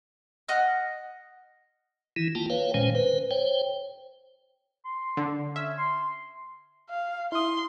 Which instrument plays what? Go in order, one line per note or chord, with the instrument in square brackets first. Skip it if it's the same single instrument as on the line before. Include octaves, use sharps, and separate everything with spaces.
[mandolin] D#5 F#5 F6
[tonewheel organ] D#3 E3 E4
A#3 F4 G5 A5
B4 C#5 F5 G5
A#2 D#3 G#3 C#4 C5 G#5
B4 C5
C5 C#5 G5
[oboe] C6
[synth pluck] D3
[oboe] C#4 [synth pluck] E5
[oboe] C6
[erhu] F5
[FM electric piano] E4 D#6 [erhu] C6